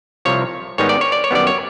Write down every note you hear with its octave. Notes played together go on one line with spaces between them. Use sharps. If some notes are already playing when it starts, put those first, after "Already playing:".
C2 C3 F3 C#5
G#2 D#3 G3 B3 D#4 C#5
D5
C#5
D5
C#5
F#2 D#3 G3 B3 D5
C#5